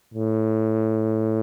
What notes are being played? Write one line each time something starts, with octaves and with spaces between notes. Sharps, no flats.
A2